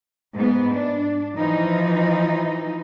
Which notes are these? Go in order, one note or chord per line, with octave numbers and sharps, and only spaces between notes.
G#2 B3
D4
E3 F3 D#4